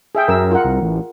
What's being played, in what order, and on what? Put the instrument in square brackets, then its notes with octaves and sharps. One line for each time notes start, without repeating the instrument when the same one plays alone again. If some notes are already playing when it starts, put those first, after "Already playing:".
[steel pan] G#4 E5 G5
[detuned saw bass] F#2 [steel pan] A#4 E5 E6
[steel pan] F4 A#4 F#5
[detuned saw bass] C2
A1